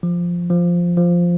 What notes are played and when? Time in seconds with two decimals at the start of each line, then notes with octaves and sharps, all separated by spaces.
0.03 F3
0.50 F3
0.97 F3